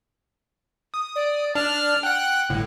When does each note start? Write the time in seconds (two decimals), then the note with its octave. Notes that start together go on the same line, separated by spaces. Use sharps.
0.94 D#6
1.16 D5
1.55 D4 D5 A5 F6
2.03 F#5 G5 F#6
2.50 G1 A2